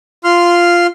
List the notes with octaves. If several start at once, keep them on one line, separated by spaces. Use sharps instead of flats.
F4 C6 F6